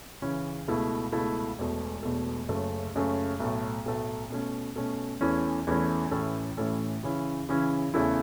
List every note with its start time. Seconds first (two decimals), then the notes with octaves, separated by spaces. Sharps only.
0.22 C#3 E3 C#4
0.68 C#2 B2 A3 E4
1.12 C#2 B2 A3 E4
1.59 E1 E2 B2 A3
2.03 E1 E2 B2 A3
2.48 F#1 F#2 C#3 A3
2.95 F#1 F#2 C#3 A3
3.40 B1 A2 A3
3.86 B1 A2 A3
4.30 B2 A3 C#4
4.76 B2 A3 C#4
5.21 E2 E3 A3 C#4 E4
5.67 E2 E3 A3 C#4 E4
6.11 A1 A2 E3 C#4 A4
6.57 A1 A2 E3 C#4 A4
7.03 C#3 E3 C#4 E4
7.49 C#3 E3 C#4 E4
7.94 E2 C#3 A3 C#4 E4